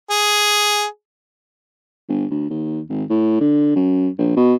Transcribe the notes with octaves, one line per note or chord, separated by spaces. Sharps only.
G#4
G1
D2
D#2
G#1
A2
D3
F#2
A#1
B2